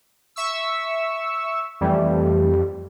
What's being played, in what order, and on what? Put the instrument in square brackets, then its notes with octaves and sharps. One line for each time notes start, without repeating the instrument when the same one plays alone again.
[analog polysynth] E5 C#6 E6
[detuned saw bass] F2 [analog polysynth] E3 A3 [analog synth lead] G3